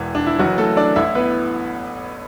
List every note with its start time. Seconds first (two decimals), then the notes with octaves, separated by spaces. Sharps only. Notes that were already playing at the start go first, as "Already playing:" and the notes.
Already playing: E1 E2 E3
0.15 D4
0.26 E4
0.39 F#1 F#2 E3 F#3 F#4
0.58 A3 A4
0.77 D4 D5
0.96 A1 A2 E3 E4 E5
1.15 B3 B4